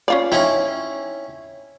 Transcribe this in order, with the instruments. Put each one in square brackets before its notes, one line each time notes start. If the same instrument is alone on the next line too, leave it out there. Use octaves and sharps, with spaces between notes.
[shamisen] C#4 F4 D5
[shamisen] C4 D#4 [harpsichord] C#4 E4